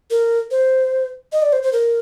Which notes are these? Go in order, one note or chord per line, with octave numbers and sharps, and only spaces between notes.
A#4
C5
D#5
D5
C5
C5
A#4